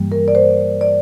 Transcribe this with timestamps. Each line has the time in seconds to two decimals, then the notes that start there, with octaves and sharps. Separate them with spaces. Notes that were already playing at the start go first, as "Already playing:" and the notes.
Already playing: G2 E3 G3 A#3
0.12 A#4
0.28 D5
0.35 C5
0.81 D5